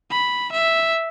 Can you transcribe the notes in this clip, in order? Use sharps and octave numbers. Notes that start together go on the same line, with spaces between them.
B5
E5